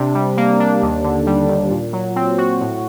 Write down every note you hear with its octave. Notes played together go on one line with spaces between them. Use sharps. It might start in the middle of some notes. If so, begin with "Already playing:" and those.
Already playing: C3 D4
G3
A#3
D4
D#2
D3
G3
D#2
A#2
F#3
C4
F#4
A2